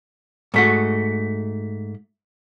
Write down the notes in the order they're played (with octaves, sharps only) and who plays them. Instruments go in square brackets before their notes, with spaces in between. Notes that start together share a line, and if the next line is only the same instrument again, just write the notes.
[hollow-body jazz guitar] G#2 A3 F#4